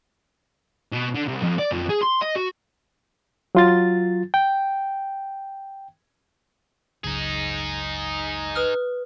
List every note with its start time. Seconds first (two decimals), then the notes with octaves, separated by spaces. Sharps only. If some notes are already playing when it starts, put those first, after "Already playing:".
0.92 B2
1.15 D3
1.28 C2
1.43 F2
1.59 D5
1.72 F2
1.90 G#4
2.03 C6
2.22 D#5
2.36 F#4
3.55 F#3 F4 A6
4.34 G5
7.04 F#1 C#2 F#2 D#4 G#4
8.55 B4 D#6 F6